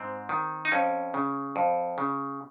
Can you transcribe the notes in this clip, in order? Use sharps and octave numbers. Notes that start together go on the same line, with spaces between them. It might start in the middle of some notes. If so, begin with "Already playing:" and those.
Already playing: G#2 C4
D#3
D#4
F2 C#4
C#3
F2
C#3